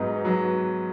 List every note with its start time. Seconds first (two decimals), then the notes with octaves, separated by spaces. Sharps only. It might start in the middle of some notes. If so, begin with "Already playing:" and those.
Already playing: G#2 F#3 B3 D#4
0.25 F#3 B3